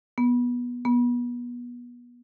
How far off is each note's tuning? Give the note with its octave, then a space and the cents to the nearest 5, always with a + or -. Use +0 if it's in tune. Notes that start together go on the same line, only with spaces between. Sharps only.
B3 -20
B3 -30